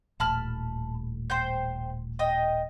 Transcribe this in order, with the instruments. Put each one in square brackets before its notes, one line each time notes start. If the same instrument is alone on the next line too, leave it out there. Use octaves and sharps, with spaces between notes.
[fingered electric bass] D#1 A1 [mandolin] A5 B5 F6
[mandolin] C5 G5 G6
D#5 G5 D#6